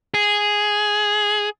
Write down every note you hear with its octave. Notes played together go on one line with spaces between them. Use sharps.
G#4